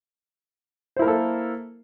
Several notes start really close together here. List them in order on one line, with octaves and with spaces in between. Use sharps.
C5 E4 A#4 A#3 A4